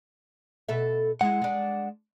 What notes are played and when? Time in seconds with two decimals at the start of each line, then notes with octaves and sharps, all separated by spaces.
0.68 B2 A4 E5
1.21 G#3 E4 F#5
1.42 G#3 D4